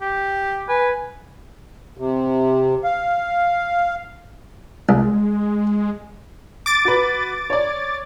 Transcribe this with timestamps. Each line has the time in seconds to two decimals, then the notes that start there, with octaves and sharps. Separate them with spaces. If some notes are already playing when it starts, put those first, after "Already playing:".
0.01 G4
0.69 B4 G#5
1.98 C3
2.84 F5
4.89 C2 G#3
6.66 D6 A6
6.85 F#4 B4
7.50 C#5 D5